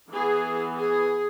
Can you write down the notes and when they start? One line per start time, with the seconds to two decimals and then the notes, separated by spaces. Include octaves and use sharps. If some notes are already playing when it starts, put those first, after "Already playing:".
0.13 E3 B3 G#4
0.78 G#4